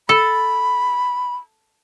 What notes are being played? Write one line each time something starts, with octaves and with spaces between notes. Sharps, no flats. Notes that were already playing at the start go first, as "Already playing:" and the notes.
A4 B5